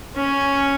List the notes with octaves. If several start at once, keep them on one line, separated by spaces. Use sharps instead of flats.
C#4